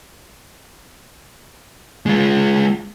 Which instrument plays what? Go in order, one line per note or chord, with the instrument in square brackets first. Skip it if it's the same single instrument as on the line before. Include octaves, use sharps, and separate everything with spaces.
[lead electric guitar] G#3 F4